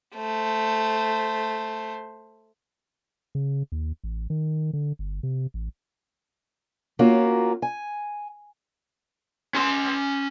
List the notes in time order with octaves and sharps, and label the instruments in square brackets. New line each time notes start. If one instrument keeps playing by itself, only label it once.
[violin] A3 C5
[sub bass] C#3
D#2
A1
D#3
D3
G1
C3
A1
[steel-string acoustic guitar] A#3 C#4 F4 F#4 A#4
G#5
[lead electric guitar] C#4 C6